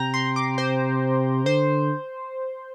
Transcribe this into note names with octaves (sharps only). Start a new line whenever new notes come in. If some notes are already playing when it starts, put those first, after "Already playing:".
Already playing: C3 G5 A#5
C6
D6
C5
D3 C5